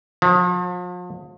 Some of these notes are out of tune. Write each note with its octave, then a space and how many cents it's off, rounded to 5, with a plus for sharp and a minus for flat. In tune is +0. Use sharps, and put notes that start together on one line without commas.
F3 +40